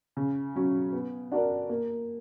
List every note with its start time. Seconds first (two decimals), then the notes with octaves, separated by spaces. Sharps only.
0.17 C#3
0.56 F#3 C#4
0.93 B3
1.32 D4 F#4 A#4 D5
1.69 A#3